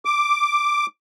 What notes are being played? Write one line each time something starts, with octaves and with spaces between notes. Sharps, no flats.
D6